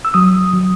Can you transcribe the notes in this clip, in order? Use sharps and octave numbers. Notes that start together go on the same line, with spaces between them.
E6
F#3 D#6
F#3